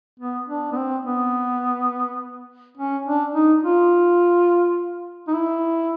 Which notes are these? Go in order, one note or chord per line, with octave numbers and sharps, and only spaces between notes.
B3
D4
B3
C4
B3
C#4
D4
D#4
F4
D#4
E4